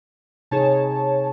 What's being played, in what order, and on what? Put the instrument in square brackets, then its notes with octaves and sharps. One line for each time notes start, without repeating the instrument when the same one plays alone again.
[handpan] C3 D#4 G#4 [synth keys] C#5 A5